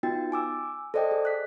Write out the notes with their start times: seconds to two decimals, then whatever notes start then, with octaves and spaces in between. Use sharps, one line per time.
0.03 B3 D#4 F4 F#4 G5 A6
0.32 G#5 D6 E6
0.94 A4 C5 D5 D#5 G5
1.11 G#4
1.25 F#6 B6